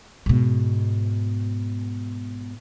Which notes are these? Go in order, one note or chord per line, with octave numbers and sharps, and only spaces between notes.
G#2 B2